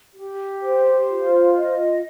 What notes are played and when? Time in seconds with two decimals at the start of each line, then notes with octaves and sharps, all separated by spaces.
0.15 G4
0.62 C5
1.09 F4
1.56 D#5